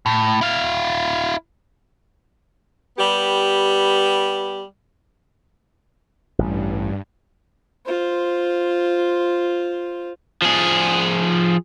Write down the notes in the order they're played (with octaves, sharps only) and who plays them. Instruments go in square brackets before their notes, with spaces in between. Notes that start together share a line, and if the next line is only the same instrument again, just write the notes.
[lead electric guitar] A2
E4 F5
[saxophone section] G3 B3 G4
[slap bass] A1 [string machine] G2
[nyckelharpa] F4 C5
[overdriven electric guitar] F3 G#4